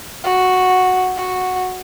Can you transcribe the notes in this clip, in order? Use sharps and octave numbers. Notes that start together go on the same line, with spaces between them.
F#4
F#4